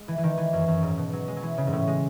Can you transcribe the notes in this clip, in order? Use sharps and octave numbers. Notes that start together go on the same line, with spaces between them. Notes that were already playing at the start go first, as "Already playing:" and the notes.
Already playing: G#3
E3
E3
D#3
E3
F#2
F#2
G#2
B2
F#3
G#3
F#3
E3
C#3
G#2
A2
G#3